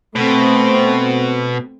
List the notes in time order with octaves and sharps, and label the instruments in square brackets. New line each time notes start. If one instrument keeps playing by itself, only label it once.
[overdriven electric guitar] B2 [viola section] A3 C4